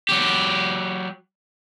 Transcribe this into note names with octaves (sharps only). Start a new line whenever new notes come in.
F#3 G4